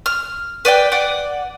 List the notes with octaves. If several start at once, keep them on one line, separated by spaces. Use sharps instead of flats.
F6
B4 D5 F#5 G5
D5 F#5 D6